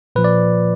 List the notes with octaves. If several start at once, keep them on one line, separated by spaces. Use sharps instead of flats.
A#2 F3 B4
D5